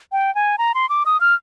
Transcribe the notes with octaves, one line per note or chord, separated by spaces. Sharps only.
G5
G#5
A#5
C6
D6
D#6
F6